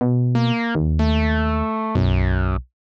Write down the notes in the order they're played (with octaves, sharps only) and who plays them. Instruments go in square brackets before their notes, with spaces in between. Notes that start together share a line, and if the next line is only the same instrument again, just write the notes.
[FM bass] B2
[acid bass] A#3
[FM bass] D#2
[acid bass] A3
[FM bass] B1 [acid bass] F#2